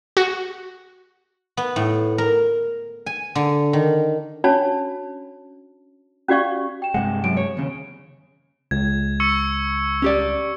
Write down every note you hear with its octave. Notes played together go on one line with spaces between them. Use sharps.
F#4
B3
A2
A#4
G#5
D3
D#3
C#4 D4 F#4 C#5 A5 B5
C#4 F#4 G4 D5 F5 C#6
G5 E7
G2 C3 G#3 F#5
F#2 D7
C#5
D#2 C#3
C#2 G#6
C#6 E6 C#7
C#4 G4 D5